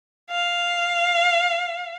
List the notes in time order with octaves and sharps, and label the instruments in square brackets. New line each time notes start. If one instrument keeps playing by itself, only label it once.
[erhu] F5